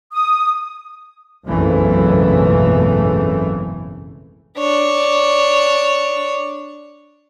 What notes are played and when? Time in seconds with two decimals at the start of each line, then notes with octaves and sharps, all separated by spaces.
0.13 D#6
1.47 F#1 B1 F2 G#2 E3 A3
4.58 D4 C#5